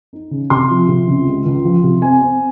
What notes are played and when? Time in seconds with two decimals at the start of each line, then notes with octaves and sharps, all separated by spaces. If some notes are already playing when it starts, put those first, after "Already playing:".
0.13 D#4
0.31 C#3
0.50 C3 C6
0.70 F3
0.88 C3
1.07 C#2
1.26 G#3
1.45 C#2
1.65 F3
1.84 C3
2.02 C4 G#5
2.21 C4